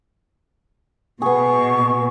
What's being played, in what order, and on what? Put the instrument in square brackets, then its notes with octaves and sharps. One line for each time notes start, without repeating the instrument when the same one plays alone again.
[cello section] B2 [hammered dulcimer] B3 G#4 [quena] C#6